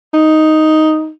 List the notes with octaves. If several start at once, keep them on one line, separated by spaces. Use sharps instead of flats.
D#4